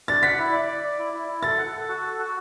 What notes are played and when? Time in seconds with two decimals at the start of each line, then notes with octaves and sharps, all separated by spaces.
0.08 D4 A6
0.23 F#5 B6
0.39 E4
0.53 D5
0.68 D5
0.83 D5
0.98 E4
1.13 E4
1.28 E4
1.43 A4 A6
1.58 F#5
1.73 A4
1.89 F#4
2.03 A4
2.18 F#4